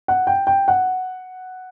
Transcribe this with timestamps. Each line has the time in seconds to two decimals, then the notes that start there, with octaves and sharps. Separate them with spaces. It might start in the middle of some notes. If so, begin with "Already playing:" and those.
0.08 F#5
0.27 G5
0.47 G5
0.68 F#5